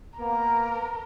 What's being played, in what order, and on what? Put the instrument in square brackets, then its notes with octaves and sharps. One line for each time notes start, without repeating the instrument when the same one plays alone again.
[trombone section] A#3 B3 [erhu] A#4